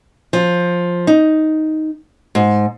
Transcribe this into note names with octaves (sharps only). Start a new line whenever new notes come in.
F3
D#4
G#2